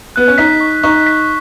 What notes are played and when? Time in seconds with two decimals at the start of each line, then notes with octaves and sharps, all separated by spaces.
0.16 B3 F#6
0.28 C#4
0.38 D#4 B6
0.60 C#6
0.83 D#4 C#6
1.07 B6